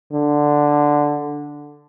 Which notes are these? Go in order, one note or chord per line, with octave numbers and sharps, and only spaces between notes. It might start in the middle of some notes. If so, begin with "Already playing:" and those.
D3